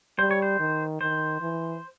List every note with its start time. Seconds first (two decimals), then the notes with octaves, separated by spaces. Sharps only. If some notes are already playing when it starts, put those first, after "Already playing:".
0.19 G3 C5
0.31 C#5
0.42 C5
0.60 D#3
1.01 D#3 C5
1.41 E3